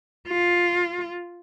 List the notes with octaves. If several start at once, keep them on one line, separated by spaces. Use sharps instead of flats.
F4